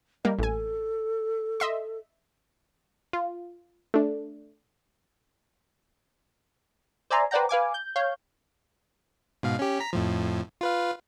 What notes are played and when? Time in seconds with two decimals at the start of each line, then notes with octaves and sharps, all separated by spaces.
0.25 G3 A#3 D#5
0.39 A1 A4 G#5
1.60 D#5 E5 C6
3.13 F4
3.94 A3 D4
7.10 C5 D5 E5 G#5 A#5 C6
7.31 B4 C5 D5 F#5 G5 A#5
7.49 B4 F5 G#5 D6
7.74 G6
7.96 C#5 F5 G6
9.43 G#2 B2 F5
9.59 C#4 G4
9.80 A#5 B6
9.93 F2 A2 F3
10.61 F4 B4 F5